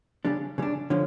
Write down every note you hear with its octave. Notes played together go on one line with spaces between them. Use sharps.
C#3 G3 D4
C#3 G3 D4
D3 F3 C#4